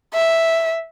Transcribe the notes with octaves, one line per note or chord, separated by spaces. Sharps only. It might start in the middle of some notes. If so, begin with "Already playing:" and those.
E5